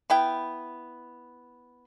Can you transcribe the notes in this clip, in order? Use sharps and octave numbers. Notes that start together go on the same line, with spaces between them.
B3 E4 G5